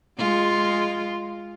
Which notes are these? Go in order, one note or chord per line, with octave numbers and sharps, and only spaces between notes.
G#3 F4